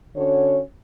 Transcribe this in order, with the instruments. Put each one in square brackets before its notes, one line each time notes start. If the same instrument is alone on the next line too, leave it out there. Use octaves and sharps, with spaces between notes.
[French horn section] D3 C#4 F#4 C#5